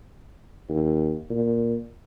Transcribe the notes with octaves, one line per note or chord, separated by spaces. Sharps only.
D#2
A#2